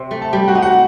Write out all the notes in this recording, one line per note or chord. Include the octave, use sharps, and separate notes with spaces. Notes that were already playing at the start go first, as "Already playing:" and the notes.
Already playing: C3 C4
A3
A5
G3 G4 G5
F#4 F#5
D#4
F#4 F#5